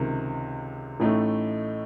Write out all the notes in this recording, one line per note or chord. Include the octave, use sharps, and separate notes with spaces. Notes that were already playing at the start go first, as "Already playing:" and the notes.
Already playing: C#2 C3 D#3
A1 A2 A3 D#4